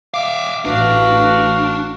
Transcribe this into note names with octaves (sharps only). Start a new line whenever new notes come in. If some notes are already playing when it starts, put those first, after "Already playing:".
E5 F5 D6
A1 D4 F#4 B4 F5